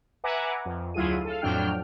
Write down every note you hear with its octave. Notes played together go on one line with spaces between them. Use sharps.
B4 E5 F#5 G#5 A#5 D6
F2
D2 F#3 E4 F4 G#4 D#7
A4 F5
F2 A2 F#3 D4 G5 F6